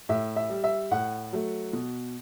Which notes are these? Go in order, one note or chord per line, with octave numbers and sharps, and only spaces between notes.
A2 E5
E5
G3
E5
A2 F#5
F#3 A3
B2